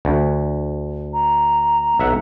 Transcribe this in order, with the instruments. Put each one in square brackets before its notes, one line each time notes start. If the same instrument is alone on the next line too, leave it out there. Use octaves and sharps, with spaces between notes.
[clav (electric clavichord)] D2
[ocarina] A#5
[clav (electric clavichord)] B1 E5 F#5